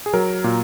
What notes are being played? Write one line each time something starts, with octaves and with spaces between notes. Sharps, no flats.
G#4
F#3 A#4
A#2